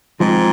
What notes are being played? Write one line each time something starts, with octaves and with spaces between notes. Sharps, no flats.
G#2 F3 G#3 C4